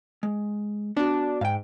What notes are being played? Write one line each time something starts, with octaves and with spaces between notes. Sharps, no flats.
G#3
B3 D4 F#4
G#2 F5 G5